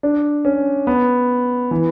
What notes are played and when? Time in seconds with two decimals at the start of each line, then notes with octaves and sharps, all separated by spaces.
0.03 D4
0.45 C#4
0.87 B3
1.71 E3